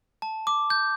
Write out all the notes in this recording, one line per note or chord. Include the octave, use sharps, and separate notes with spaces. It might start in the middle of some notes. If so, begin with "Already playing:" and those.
A5
D6
G6